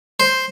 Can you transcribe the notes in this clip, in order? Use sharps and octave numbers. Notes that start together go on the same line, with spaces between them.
C5